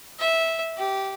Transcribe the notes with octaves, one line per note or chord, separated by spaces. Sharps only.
E5
G4